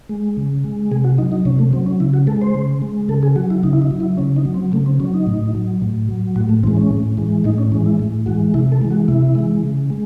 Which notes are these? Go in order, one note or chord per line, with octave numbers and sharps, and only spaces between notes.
G#3
C#3
G#3
C3 G#4
F#4
F#3 D#4
D#4
C3 C#4
A3
F#3 C4
C#4
C#3 E4
F#4
G#3 A4
C5
C#3
G#3
C#3 A4
G#4
F#3 F#4
E4
C#3 D#4
E4
D#4
F#3
E4
C#3 C#4
D#4
F#3
C4
C#3 A3
C4
F#3 C#4
D#4
A2
F#3
A2
F#3
A2 F#4
A3
E3 G#3 C4
C#4
A2
E3 G#3
A2 D#4
C#4
E3 G#3 C#4
E4
A2
E3 G#3 F#4
C3 E4
A4
E3 G#3
F#4
C3 E4
E3 G#3
C#3
G#3